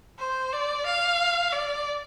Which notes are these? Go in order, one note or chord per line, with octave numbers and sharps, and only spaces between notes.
C5
D5
F5
D5